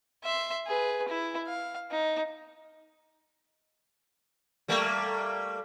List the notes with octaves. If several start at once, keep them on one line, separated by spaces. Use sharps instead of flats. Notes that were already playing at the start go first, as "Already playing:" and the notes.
E5 C6
G#4 B4
E4
F5
D#4
G3 A3 A#3